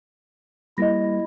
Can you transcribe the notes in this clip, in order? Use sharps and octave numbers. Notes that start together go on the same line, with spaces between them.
G3 A#3 E4 D#5 A#6